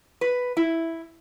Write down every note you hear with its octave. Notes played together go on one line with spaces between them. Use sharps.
B4
E4